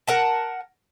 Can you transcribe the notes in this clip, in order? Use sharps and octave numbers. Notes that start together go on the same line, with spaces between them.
A#4 F#5 A5